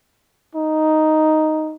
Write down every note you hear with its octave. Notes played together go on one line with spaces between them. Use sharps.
D#4